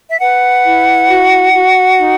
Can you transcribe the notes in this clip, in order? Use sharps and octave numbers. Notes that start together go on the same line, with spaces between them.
E5
B4 F#5
E4
F#4
F#4
D#4